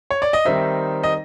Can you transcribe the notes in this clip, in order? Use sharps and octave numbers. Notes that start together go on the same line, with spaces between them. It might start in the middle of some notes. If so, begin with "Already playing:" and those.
C#5
D5
D#5
D#3 G3 C4 D#4 E5
D#5